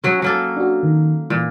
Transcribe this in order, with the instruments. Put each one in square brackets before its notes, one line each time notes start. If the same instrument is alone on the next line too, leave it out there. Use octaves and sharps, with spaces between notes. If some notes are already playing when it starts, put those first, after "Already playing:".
[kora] F#3 C#4
F#3 A#3 A4
[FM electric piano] D4 F#4
D#3
[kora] A#2 [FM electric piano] E3